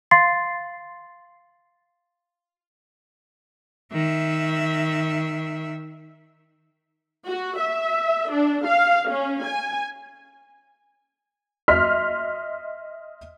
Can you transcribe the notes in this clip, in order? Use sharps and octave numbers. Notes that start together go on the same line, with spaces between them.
F5 C6 A6 C7
D#3 E5
F#4
E5
D4
F5
C#4
G#5
D#5 E5 C6 F6 B6